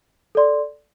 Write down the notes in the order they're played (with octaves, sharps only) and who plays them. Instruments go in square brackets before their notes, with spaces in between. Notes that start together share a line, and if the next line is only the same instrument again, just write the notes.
[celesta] A4 D5 C6